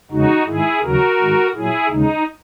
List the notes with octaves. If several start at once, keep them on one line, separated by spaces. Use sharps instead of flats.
E2 C#3 G#3 D#4 F#4
G#2 D#3 G#3 E4 G#4
D#2 C#3 F#3 F#4 A#4
G#2 D#3 G#3
A#2 F#3 E4 G#4
D#2 C#3 G#3 D#4